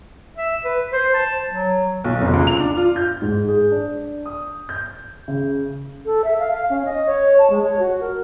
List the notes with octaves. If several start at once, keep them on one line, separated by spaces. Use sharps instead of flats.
E5
B4
C5
A5
F#3
B1
F1
C#2
F7
D4
F4
G6
G#2
G#4
D4
D#6
G6
C#3
A4
E5
F5
F5
C#4
D#5
C#5
A5
G#3
C#5
F#4
A#4